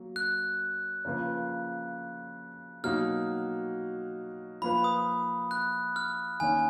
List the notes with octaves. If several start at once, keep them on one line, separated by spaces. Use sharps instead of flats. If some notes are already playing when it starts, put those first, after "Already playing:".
Already playing: F#3 A#3
F#6
C#3 F3 A#3 F4 B4
B2 F#3 A#3 D#4 F#4 F6
F3 A#3 F4 B4 B5
D#6
F#6
F6
D#3 A#3 C#4 G#5